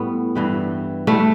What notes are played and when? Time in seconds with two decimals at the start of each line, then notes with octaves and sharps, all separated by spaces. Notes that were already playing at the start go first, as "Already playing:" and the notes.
Already playing: A2 G3 B3
0.35 G2 E3 G3
1.07 E3 G3 A3